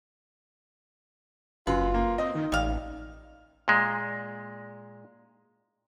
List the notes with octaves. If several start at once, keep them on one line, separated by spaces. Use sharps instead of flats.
F#1 F#2 F4 B4
A#3
C4 D#5
D#3 D#4
A1 G3 F5
A#2 G#3